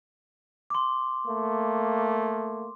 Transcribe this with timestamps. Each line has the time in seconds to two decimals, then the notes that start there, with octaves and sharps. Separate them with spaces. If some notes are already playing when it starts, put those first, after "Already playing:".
0.70 C6 D6
1.27 A3 A#3